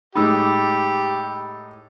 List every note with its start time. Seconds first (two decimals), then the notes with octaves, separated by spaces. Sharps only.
0.15 A2 G#3 D#4 G4 B5 D6 E6